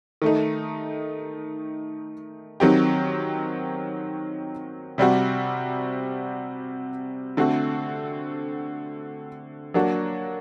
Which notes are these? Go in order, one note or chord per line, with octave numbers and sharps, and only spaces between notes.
D#3 A3 D#4
D#3 F#3 C4 G4
C3 G3 C4 F#4
D3 A3 C4 F#4
F#3 A#3 D4 F#4